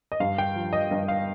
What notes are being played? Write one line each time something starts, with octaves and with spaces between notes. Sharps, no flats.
D#5
G2 F5
G5
F3
D#5
G2 D#5
F5